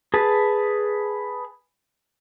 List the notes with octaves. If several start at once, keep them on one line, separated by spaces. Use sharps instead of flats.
G#4 B4 A5